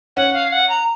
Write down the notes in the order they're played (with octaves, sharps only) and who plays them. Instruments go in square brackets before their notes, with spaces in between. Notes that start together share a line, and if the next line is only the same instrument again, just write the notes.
[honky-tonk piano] C#4 [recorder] F#5
[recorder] F5
F#5
A#5